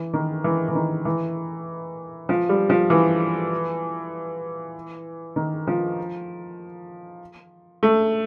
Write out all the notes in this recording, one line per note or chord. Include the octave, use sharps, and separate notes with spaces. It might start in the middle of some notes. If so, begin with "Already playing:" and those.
Already playing: E3
D#3
E3
E3
D#3
E3
F3
G3
F3
E3
D#3
F3
A3